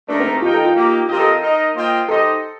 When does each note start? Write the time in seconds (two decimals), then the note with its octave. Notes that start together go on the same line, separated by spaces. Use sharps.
0.08 A3 D4 D#4 A#4
0.20 C4
0.36 G4
0.42 D#4 F4 A#4 D#5 G5
0.54 A4
0.65 F4
0.75 A#3 D#4 G4
1.09 C4 F4 G4 A#4 D#5
1.19 A4
1.41 D#4 A#4 D#5
1.75 A#3 F4 C5 D#5 G5
2.08 D#4 G4 A4 C5 D#5